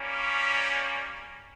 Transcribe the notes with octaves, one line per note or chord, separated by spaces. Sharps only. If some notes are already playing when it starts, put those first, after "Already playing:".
Already playing: G3 A#3 C#4